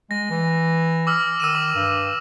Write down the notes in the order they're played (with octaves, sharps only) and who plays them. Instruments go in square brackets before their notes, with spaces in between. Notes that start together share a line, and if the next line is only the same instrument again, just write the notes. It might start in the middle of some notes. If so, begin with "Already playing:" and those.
[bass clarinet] G#3 [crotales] A#6
[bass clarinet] E3
[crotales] D6 E6 F6
[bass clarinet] D#3 [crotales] E6 D#7 E7
[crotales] D6
[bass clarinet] G2